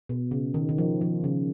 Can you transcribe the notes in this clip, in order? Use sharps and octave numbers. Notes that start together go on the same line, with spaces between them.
B2
C#3
D#3
D#3
F3
F3
C#3